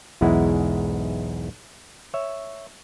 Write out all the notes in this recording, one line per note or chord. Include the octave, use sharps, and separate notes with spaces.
B1 E2 G#2 G#3 E4 F#5
C#5 E5